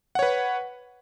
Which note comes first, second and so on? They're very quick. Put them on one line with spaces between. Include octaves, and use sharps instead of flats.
F#5 C#5 B4